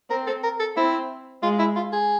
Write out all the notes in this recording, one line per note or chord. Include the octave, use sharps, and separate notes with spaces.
C4 A#4
A4
A#4
A4
C4 E4
G#3 F4
E4
F4
G#4